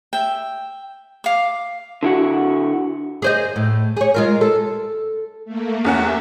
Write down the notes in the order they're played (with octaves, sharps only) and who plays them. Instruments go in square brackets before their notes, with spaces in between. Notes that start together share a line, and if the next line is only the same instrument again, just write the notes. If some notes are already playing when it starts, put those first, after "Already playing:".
[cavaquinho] E5 G5
F5 D6
[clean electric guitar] D3 E4 F#4
[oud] G#4 C5 D#5
A2
G#4 C#5
G#3 F4 A#4
A4
[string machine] A3 A#3
[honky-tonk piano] E2 C#4 F#5 [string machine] G4 E5